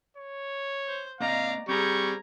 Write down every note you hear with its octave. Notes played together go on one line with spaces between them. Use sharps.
C#5
C5
A#3 C4 D5 D#5 F5 A#5
G3 C4 G#4 A#5 C#6 G#6